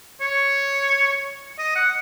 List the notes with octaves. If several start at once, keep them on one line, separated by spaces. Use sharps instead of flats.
C#5
D#5
F#5